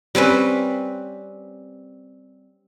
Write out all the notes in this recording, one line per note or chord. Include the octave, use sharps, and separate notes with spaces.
G3 C4 C#4 B4